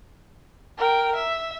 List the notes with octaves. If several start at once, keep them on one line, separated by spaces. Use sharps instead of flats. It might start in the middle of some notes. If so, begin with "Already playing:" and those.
A#4 G5
E5